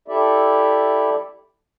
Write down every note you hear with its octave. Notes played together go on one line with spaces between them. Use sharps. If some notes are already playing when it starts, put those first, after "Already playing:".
E4 G4 A4 D5 E5